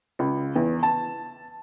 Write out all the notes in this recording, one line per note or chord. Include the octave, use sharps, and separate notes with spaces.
C#2
E2
A5